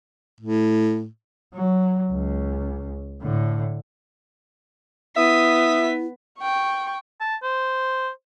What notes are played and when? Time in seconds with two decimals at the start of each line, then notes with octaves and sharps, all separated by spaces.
0.40 A2
1.54 F#3
2.12 C#2
3.22 A2 D3
5.17 B3 E4 E5 D#6 B6
6.39 G5 C#6
7.21 A5
7.43 C5